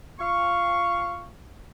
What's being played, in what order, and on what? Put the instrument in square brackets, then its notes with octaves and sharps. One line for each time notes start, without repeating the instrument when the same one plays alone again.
[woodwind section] F4 F5 C#6